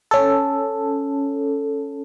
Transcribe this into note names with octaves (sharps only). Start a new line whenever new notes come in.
C#4 A4